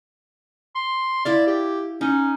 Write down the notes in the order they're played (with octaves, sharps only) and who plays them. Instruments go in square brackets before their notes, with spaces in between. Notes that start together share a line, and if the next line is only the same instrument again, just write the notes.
[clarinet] C6
[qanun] E4 E5 F5 [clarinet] D5
[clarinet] G4
[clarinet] C#4 [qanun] D#4